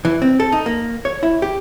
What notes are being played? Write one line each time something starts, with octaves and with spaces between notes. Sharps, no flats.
E3
C4
A4
D#4
A#3
C#5
E4
G4